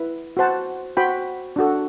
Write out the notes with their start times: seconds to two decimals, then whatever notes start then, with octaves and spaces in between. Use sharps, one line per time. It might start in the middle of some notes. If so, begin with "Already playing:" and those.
Already playing: E4 B4
0.37 F#4 C5 F#5 A5
0.97 F#4 C5 G5 B5
1.56 D4 F#4 A4